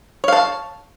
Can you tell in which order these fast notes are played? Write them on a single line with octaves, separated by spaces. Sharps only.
C#5 F5 A5